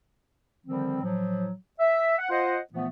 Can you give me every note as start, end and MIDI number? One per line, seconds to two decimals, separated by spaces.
0.66 1.01 50
0.66 1.01 51
0.66 1.01 53
0.66 1.01 55
0.66 1.01 60
1.02 1.52 45
1.02 1.52 53
1.02 1.52 54
1.79 2.18 76
2.19 2.29 78
2.30 2.58 65
2.30 2.58 72
2.30 2.58 75
2.30 2.58 78
2.73 2.86 46
2.73 2.86 52
2.73 2.86 53
2.73 2.86 57
2.73 2.86 59